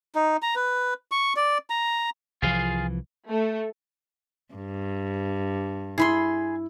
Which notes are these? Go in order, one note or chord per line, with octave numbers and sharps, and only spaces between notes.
D#4
A#5
B4
C#6
D5
A#5
C2 E3 F3 F4 G#4 F5
A3
G2
E4 G#4 B5 C6